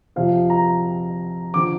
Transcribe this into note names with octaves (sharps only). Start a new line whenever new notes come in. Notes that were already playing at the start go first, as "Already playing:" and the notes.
F2 C3 F3 F5
A#5
D3 F3 D6